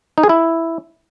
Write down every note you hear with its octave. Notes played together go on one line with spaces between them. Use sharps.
D#4
G#4
E4